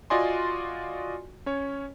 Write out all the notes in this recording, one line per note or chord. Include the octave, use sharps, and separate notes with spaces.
F4 F#4 D5 D#5 G#5 C6
C#4 C#5